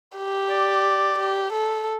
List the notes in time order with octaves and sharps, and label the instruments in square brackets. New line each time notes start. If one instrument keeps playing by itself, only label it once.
[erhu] G4
[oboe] D5
[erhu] G4
A4